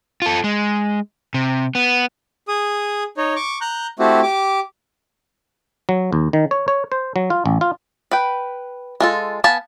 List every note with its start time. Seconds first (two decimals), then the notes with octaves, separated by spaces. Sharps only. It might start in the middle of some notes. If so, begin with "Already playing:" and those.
0.22 F4 A4
0.44 G#3
1.34 C3
1.75 B3
2.48 G#4 D#6
3.17 D#4 C#5
3.36 C#6 D6
3.61 A#5 F#6 G6
3.99 A3 C4 E4 F#4 G4
4.23 G4 D6
5.89 F#3
6.13 D#2
6.33 D#3
6.51 C#5
6.68 C#5
6.92 C5
7.16 F#3
7.30 F4
7.46 A1
7.61 F4
8.11 B4 G5
9.00 G#3 F4 A4
9.44 B3 F5 G#5 A5 B5